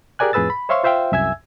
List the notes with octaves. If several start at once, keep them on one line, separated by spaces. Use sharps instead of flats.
G4 G#4 A#4 D5 G#5 F#6
F2 A2 G#4 B4 E6 A6
B5
C5 C#5 E5 F5 C6 C#6
F4 C5 E5 F5 G5
C2 F#2 E5 G#5 E6 G#6